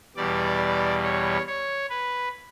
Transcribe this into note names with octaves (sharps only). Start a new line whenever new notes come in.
E2 B2 G3 D5
C#5
C#5
B4